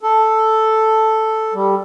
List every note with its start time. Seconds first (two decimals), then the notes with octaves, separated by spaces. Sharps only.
0.03 A4
1.54 G3